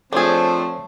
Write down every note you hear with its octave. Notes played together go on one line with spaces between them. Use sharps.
F3 A3 C4 D4 G#4 A4 C5 C#5